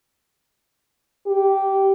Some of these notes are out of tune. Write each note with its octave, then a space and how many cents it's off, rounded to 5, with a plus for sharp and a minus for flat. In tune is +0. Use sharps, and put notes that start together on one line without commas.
G4 -10